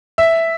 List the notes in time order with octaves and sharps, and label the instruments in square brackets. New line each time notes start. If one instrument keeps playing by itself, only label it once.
[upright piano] E5